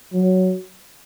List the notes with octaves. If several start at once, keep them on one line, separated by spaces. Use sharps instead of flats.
F#3